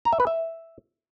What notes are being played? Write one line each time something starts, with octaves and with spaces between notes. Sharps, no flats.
A#5
E5
B4
E5